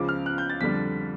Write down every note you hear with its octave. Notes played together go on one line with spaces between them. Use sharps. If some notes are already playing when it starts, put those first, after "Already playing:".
Already playing: C#2 C#3 F3 D6
F6
F#6
G6
A6
F2 D3 G3 B6